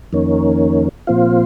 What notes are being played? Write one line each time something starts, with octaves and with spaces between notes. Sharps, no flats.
F2 D#3 A#3 C#4
A#2 F3 C4 F4